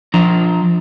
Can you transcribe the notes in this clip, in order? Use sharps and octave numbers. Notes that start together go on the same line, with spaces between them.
F3 D4 A#5